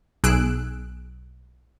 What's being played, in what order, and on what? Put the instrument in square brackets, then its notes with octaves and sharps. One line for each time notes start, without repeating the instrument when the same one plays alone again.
[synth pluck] B1 G#4 E6 F#6 D7